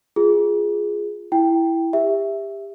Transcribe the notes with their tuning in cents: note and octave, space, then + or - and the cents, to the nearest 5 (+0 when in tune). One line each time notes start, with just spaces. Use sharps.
F4 +0 G#4 +0
E4 +0 G5 +0
G4 +25 E5 +0